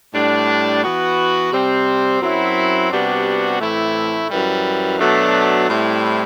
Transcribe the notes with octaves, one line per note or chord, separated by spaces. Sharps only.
A2 G3 D4
E3 B3 F#4
C3 G3 C4
F#2 F#3 C4 E4
C3 G3 B3 D4 F#4
A2 E3 A3 C4 E4
F#2 E3 G3
B2 F#3 A3 D4
A2 G3 C4 E4